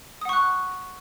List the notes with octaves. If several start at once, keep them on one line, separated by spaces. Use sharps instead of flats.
F#5 C#6 D#6 F#6